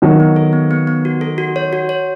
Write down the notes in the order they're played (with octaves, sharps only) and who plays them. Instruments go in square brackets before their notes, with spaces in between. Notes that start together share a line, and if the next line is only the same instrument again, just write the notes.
[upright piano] D#3 F#3 [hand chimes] B3
[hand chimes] B3
A4
B3
B3
B3
F#4
A4
F#4
C#5
F#4
C#5